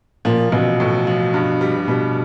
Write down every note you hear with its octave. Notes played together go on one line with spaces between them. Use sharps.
A#2 F3
A1 B2
A2
F3
G2
G3
B2 G3